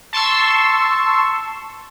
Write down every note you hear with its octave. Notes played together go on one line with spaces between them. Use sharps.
A5 C6 C#6 E6